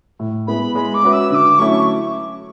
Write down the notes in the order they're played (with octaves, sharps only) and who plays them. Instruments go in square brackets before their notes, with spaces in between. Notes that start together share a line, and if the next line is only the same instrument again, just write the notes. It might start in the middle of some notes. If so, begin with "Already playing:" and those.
[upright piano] A2
[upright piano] G#3 B3 E4 [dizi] B5
[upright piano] G#3 [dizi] B5
[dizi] D6
[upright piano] C#4 F#4 B4 E5
[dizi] E6
[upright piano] D3 [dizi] D6 E6
[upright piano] F#3 A3 C#4 E4 [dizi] C#6